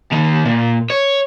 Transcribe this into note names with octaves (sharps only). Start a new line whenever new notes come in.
D#2 D#3
A#2
C#5